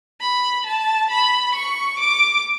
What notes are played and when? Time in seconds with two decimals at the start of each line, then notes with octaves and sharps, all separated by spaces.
0.21 B5
0.66 A5
1.10 B5
1.55 C#6
1.99 D6